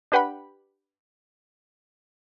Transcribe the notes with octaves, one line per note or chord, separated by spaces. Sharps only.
D4 G4 B4 F#5 G5 B5